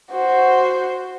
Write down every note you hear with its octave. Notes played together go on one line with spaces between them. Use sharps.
F#4 C5